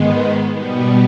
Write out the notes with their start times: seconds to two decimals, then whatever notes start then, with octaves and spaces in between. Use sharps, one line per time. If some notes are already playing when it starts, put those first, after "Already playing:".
Already playing: G#2 D#3 G#3 B3
0.51 B2 G3 B3